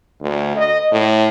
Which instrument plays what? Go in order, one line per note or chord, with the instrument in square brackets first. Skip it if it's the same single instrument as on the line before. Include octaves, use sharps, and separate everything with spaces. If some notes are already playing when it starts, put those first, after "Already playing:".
[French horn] D2
D#5
A2